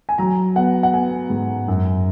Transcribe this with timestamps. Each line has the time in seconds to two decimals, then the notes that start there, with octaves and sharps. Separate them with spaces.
0.09 G#5
0.18 F#3 A#5
0.56 B3 F#5
0.83 F#5
0.93 B3 G#5
1.30 G#2
1.68 F#2